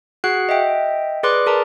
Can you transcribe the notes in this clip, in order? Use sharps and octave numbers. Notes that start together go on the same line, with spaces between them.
F#4 G#4 F#5 F#6 C7
D#5 E5 G5
G#4 B4 D5 C6 D6 F#6
G#4 A#4 A5 A#5